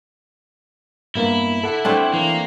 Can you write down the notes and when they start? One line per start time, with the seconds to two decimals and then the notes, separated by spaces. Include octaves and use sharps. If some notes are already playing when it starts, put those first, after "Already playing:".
1.15 G2 A#3 B3 E4
1.63 A4 F#5
1.85 A3 C4 D4
2.14 E3 A#3